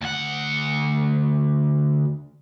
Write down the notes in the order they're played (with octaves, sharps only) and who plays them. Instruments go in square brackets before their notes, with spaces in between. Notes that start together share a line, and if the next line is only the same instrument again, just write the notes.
[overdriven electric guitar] D2 F#5